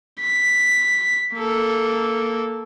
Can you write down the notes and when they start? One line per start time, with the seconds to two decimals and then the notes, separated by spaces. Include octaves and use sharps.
0.20 B6
1.35 A#3 A4